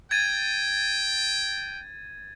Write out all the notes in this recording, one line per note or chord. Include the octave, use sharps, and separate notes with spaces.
G5 G#6 A6 D#7